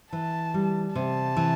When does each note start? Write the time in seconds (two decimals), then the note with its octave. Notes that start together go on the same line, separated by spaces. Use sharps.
0.12 E3 A5
0.54 G3
0.95 C3 A5
1.37 E3